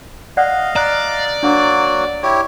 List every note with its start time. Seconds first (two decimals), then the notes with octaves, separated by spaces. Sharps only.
0.37 D5 D#5 F5 F#5 F#6
0.76 D5 A#5 F#6
1.43 F#3 A#3 D4 F#4
2.23 E4 G4 C#5